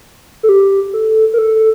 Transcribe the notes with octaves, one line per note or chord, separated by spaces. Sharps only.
A4
G4
A4
A#4
A4